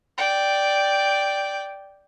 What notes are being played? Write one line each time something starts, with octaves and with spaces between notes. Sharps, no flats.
D5 G5